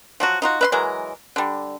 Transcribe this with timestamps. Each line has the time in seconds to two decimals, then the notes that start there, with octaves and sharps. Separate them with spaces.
0.20 F3 F#3 F#4
0.42 D#4 F4 F#4
0.61 B4 E5 C6
0.72 E3 F#3 G#3 A#4
1.36 D3 G3